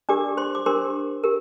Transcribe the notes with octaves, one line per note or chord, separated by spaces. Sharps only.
D4 G4 A#4 D5 D6
C5 C6
D6
D4 G4 A#4 C5 C6
G4 A#4